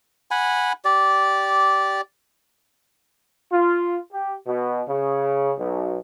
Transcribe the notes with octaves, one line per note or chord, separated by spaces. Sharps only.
F#5 G#5 B5
G4 D5
F4
G4
B2
C#3
B1